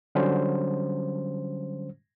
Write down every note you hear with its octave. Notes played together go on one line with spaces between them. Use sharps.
D3 F#3 G3 C#4 C5